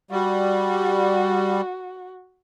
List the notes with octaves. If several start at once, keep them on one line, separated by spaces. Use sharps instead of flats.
G3 F#4